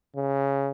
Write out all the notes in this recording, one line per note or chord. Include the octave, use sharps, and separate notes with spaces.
C#3